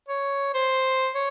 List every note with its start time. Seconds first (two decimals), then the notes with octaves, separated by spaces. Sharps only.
0.08 C#5
0.54 C5
1.15 C#5